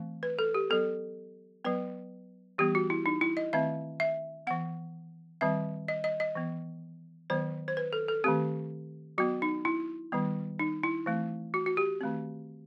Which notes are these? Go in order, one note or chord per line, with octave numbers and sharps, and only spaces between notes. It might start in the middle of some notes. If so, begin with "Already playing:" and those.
Already playing: E3 A3 C4
B4
A4
G4
F#3 B3 A4
F#3 B3 B4
E3 G3 B3 G4
F#4
E4
D#4
E4
D#5
D#3 A3 C4 E5
E5
E3 B3 F#5
D#3 G3 C4 E5
D#5
D#5
D#5
E3 B3
D#3 F#3 B3 C5
C5
B4
A4
A4
D#3 A3 C4 G4
F#3 B3 F#4
D#4
E4
D#3 G3 B3
D#4
E4
E3 A3 C4
F#4
F#4
G4
D#3 A3 C4